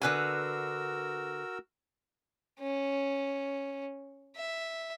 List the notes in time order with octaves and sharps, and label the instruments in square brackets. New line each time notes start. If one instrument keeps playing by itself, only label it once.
[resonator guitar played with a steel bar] D3 B4 G#5 [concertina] F#4 A#4 E6
[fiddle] C#4
E5